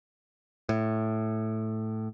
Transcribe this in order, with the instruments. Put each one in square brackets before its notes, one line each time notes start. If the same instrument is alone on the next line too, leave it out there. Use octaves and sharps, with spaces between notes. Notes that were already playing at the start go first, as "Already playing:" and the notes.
[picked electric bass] A2